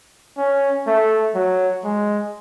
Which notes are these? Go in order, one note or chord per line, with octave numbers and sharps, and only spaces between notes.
C#4
A3
F#3
G#3